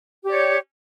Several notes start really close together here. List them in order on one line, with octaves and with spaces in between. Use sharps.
G4 D5 C#5